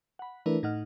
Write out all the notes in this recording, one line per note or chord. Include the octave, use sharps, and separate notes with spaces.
F#5 B5
E3 A3 D4 E4 A#4 B4
A2 D#4 D#5 F#5 F6